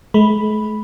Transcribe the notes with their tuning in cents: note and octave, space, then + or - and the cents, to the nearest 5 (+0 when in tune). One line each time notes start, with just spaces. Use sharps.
G#3 +45 B5 +0